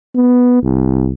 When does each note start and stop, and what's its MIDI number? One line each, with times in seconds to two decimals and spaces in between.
0.15 0.59 59
0.63 1.12 36